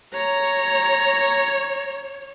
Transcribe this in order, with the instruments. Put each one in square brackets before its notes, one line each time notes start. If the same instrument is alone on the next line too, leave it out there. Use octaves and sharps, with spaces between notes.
[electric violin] C#5 [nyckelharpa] A#5